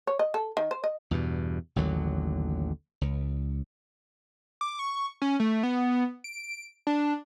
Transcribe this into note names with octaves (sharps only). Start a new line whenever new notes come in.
C#5
D#5
A4
D#3
C5
D#5
E2 G2 B2
A1 D#2 D3 F#3
C#2
D6
C#6
C#4
A3
B3
D7
D4